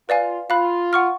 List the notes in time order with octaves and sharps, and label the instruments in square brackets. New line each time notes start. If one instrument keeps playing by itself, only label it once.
[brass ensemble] F4 [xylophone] B4 D5 F5 G#5
[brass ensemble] F4 [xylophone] F5 B5 F#6
[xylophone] F#5 C#6 F6